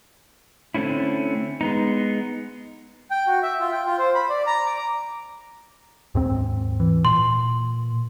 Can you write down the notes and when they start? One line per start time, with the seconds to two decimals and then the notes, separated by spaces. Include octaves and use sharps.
0.74 D3 A3 C4 C#4 E4
1.61 G#3 B3 D#4
3.11 G5
3.27 F#4
3.43 E5
3.60 F4
3.72 G5
3.86 F4
3.99 C5
4.15 B5
4.30 D5
4.47 A#5
4.66 D6
6.15 D#2 G#2 C4
6.80 E3
7.05 A#2 C6